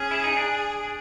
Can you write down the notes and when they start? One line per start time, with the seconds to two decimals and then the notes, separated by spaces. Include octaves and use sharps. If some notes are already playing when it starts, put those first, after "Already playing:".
Already playing: C#4 G#4
0.11 E4
0.24 D#4
0.37 D4